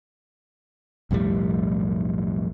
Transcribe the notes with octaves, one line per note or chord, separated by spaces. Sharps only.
B1 F2 A2 G3